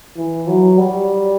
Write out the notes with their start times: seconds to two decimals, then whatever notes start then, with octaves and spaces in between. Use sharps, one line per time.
0.17 E3
0.47 F#3
0.78 G3